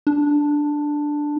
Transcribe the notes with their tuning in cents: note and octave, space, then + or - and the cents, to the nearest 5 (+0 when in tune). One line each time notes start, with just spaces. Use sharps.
D4 +5